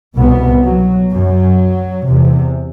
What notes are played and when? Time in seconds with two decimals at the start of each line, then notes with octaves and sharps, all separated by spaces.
0.16 C2 B2 B3
0.65 F#3
1.11 F#2 F#3
2.07 E2 C3